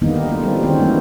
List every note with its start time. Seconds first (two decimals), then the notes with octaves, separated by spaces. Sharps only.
0.01 D3 D#3 G3 A#3 B3 D#4
0.14 G4
0.29 A3 F4
0.43 E3 G3 C4 F4
0.63 D#3 G#3 C4 C#4
0.79 E3 G3 A#3 B3 C#4